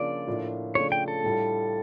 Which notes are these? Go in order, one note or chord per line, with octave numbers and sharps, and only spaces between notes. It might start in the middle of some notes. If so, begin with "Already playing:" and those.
Already playing: C#3 F3 A#3 D4 F4 D5
A2 F3 A#3 D4 F4
C#3 F3 A3 D4 F4 C#5
G5
A4
A2 G3 D4 F4